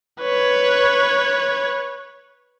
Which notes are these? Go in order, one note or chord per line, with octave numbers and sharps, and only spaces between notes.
B4 C#5